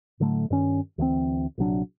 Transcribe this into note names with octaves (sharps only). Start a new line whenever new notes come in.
A2 D3 F#3 A3
G2 D#3 C#4
D2 E3 F3 C4
A#1 C3 F#3 D4